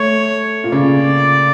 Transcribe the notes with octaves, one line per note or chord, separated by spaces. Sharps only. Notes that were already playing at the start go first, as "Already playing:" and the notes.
Already playing: A3 C#5
A#2
C#3 D5